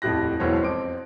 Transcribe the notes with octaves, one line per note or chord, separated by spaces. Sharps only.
D#1 F2 A2 G4 F#6 A#6
E1 B1 E3 C5 C#5 F#6
F2 C4 D6 D7